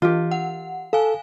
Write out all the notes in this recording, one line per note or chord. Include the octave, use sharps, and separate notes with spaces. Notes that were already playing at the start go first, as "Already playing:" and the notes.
E3 F4 G4
F#5
A4 F5 G#5